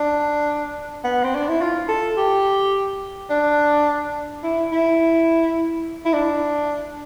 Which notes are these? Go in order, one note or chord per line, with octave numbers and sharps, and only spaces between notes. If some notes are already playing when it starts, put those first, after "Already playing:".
Already playing: D4
B3
C4
D4
E4
F4
A4
G4
D4
E4
E4
E4
D4